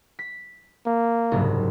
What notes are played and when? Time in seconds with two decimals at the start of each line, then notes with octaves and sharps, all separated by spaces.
0.19 B6
0.86 A#3
1.31 F#1 C2 G#2